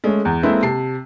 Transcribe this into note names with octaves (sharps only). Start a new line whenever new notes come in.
G#3 A3 C#4
E2
G#3 A#3 C4 E4 A4 B4
C3 A5 C7